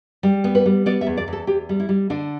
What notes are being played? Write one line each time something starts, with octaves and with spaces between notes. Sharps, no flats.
G3
B3
B4
G3
B3 D5
E5
E2
D5
E2
A4
E2 G4
G3
E4
G3
D3 D4